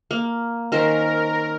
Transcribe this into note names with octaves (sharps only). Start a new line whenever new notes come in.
A#3
D#3 C#4 A#4 C5